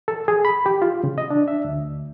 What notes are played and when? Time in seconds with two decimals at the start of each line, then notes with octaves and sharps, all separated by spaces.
0.08 A4
0.28 G#4
0.45 B5
0.66 G4
0.82 F4
1.04 C#3
1.18 D#5
1.31 D4
1.48 E5
1.65 D2